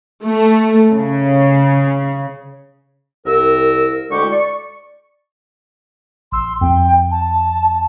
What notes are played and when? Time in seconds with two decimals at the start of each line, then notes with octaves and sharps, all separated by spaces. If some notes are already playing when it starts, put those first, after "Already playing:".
0.24 A3
0.93 C#3
3.26 C2 A#4 E6
4.10 D2 D3 G#3 E4 G4 C#6
4.31 D5 C#6
6.32 A#1 C6 E6
6.61 F2 G5
7.11 A5